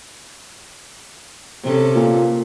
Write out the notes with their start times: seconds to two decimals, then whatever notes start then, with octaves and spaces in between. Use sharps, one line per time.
1.63 C3 C#4 A4
1.96 A#2